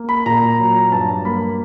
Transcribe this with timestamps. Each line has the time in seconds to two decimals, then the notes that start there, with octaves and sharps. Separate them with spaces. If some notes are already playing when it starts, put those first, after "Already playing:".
Already playing: A#3
0.09 B5
0.26 A#2 A#5
0.59 F#3
0.92 G2 A5
1.25 A#3 B5